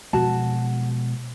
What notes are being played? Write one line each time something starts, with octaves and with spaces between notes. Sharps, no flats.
B2 F3 G#3 F#4 A5